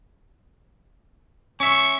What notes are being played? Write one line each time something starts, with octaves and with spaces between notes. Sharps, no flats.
C#4 E5 C#6